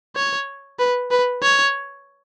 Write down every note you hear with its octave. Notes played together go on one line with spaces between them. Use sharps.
C#5
B4
B4
C#5